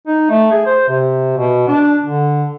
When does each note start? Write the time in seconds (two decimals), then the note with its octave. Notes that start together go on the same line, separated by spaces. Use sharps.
0.07 D#4
0.30 A3
0.52 G#4
0.66 C5
0.89 C3
1.37 B2
1.68 D4
2.03 D3